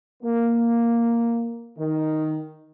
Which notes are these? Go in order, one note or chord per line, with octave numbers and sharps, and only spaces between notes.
A#3
D#3